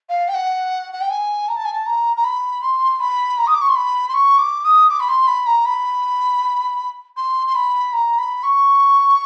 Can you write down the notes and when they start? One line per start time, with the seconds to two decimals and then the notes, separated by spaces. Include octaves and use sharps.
0.09 F5
0.28 G5
0.34 F#5
0.92 F#5
1.01 G5
1.10 G#5
1.48 A#5
1.56 A5
1.65 G#5
1.73 A5
1.86 A#5
2.16 A#5
2.24 B5
2.62 C6
3.00 B5
3.38 A#5
3.47 D#6
3.54 D6
3.61 C#6
3.68 C6
3.75 B5
4.08 C6
4.14 C#6
4.38 D6
4.64 D#6
4.89 D6
5.00 B5
5.08 C6
5.27 B5
5.46 A#5
5.65 B5
7.16 C6
7.47 C6
7.55 B5
7.93 A#5
8.18 B5
8.43 C#6